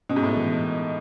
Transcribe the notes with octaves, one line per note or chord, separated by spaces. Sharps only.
B2 C#4
G#2
A2
E3